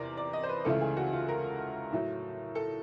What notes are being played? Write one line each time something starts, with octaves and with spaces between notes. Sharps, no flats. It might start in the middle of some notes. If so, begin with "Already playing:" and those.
Already playing: E2 C3 A#4 D5
D5
D#5
C5
B4
C#2 C#3 E3 A3 A4
G#4
F#4
F4
A#4
A2 F#3 A3
A4